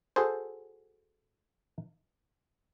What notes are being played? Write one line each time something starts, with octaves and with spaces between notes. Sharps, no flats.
F#4 G#4 A4 C5